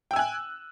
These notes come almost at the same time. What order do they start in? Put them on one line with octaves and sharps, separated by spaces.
G5 E6 G#5 F#6